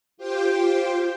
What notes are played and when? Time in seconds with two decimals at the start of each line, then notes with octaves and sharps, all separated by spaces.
0.17 F4 G4 C5 G5